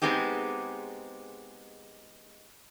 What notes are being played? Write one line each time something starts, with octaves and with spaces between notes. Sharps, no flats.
G#3 B3 C4 D#4 G4 G#4